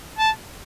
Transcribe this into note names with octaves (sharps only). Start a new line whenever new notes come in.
A5